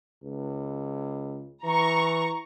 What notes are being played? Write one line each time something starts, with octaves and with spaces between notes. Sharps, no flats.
C#2
E3 A#5 C#6